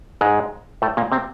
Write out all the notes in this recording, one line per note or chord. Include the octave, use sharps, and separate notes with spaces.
G#2 G#3
A2 A3
A#2 A#3
C3 C4